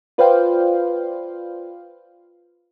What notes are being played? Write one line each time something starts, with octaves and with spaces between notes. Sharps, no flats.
F4 B4 C5 D5 F5 G5